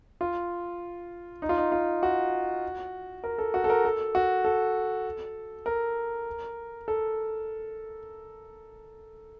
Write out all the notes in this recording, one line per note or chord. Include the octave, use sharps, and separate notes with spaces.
F4
D#4
F4
D#4
F4
F#4
A#4
A4
F#4
A4
A#4
A4
F#4
A4
A#4
A4